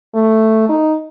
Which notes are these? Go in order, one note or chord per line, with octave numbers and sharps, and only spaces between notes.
A3
D#4